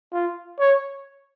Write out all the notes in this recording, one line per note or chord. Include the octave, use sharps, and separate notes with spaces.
F4
C#5